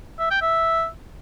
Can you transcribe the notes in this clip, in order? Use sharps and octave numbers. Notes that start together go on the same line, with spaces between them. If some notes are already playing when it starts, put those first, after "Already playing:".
E5
G5
E5